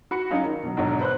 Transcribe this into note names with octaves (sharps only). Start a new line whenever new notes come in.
F#4 B5 C#7
F#3 C#4 D#4 F4 G#4
D#3
B2 F#3
B1 E2 G#2 D3 F#3
B4 C5 F#6